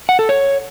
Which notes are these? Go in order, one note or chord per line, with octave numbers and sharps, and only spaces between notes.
F#5
A4
C#5